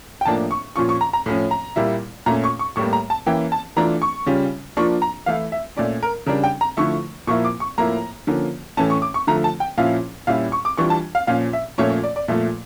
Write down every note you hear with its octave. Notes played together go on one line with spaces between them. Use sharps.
G5
A2 F3 A#3 D4 A5
C#6
A#2 F3 C#4 F4 C#6
C#6
A#5
A#5
A2 F3 C#4
A#5
A#2 G3 A#3 E4
A#2 A3 C#4 A#5
C#6
C#6
A2 G3 A#3 C#6
A#5
A5
E3 A#3 C#4 E4 G5
A5
E3 A3 D4 F4 A#5
C#6
C#3 G3 C#4 F4
F3 A#3 D4 F4 C#6
A#5
E3 A3 E4 F5
E5
A#2 A3 C#4 D5
A#4
C#3 G3 D4 A#4
G5
A#5
D3 F3 A3 E4 C#6
A#2 F3 A#3 E4 C#6
D6
C#6
A2 F3 A#3 E4 A#5
D3 F3 A#3 C#4
A2 E3 A3 C#4 A5
C#6
D6
C#6
D3 F3 A3 A#5
A5
G5
A#2 F3 C#4 E4 F5
A#2 G3 C#4 E4 F5
C#6
D6
E3 G3 D4 F4 C#6
A5
F5
A#2 F3 C#4 F5
E5
A#2 F3 A3 C#4 C#5
C#5
D5
D5
A#2 F3 A3 E5